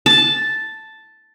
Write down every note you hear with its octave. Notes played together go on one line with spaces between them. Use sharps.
A5